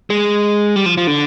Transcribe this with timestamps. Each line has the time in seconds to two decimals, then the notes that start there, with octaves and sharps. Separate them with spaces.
0.10 G#3
0.76 G3
0.86 F3
0.97 F3
1.07 D3